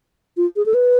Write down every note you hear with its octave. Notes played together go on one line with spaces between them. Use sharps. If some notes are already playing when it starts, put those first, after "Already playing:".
F4
G#4
A4
B4